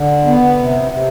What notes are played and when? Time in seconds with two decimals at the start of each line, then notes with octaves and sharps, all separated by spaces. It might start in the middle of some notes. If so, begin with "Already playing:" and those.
Already playing: D3
0.26 B3
0.59 C3
0.92 C3